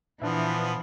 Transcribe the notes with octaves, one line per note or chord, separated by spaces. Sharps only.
A#2 E3 F3 B3 D4 E5